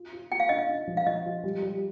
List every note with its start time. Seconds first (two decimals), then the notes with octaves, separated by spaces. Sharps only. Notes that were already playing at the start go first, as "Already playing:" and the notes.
Already playing: F4
0.12 F4
0.31 F4 G5
0.40 F5
0.49 D4 D#5
0.58 F5
0.68 D4
0.87 F3
0.97 F5
1.06 F3 D#5
1.25 F4
1.44 G3
1.62 G3